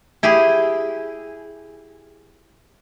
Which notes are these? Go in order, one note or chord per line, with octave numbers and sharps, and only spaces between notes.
E4 G4 G#4